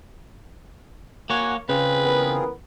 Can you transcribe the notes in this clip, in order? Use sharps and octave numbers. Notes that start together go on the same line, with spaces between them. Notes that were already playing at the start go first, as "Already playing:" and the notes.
A#3 F#4 C#5 F#5 G#5
C#3 C4 F4 G#4 B4
E2 B3 A#4